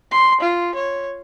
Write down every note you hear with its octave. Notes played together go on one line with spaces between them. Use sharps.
C6
F4
C#5